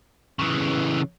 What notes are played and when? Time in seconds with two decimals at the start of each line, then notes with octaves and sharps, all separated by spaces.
0.39 C#3 E3